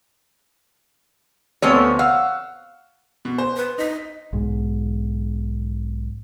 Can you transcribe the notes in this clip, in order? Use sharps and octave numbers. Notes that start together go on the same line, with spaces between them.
D2 F3 A3 B3 C4 C#5
F5 F#5 E6
B2
C5
B4
D#4 D#5 B6
B1 G#2